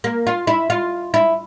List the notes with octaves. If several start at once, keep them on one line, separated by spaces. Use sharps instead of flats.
A#3
F4
E4
F4
E4